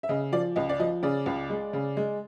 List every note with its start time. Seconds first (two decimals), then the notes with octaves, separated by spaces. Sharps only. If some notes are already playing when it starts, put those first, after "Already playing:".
0.03 E5
0.09 C#3 D#5
0.32 F3 D5
0.56 C#2 D#5
0.69 D5
0.79 F3 D#5
1.03 C#3 D5
1.26 C#2
1.50 G#3
1.73 C#3
1.97 G#3